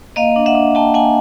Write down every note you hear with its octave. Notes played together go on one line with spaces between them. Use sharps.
A#3 D#5 F5
D4
E5 F#5
D4
A#3 G5 A5
A#3 F#5 G#5